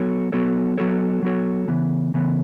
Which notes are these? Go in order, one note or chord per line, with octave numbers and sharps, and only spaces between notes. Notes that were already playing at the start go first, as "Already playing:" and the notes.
Already playing: F#3 B3 F#4 A4 C#5
F#3 B3 F#4 A4 C#5
F#3 B3 F#4 A4 C#5
F#3 B3 F#4 A4 C#5
C#3 E3 B3
C#3 E3 B3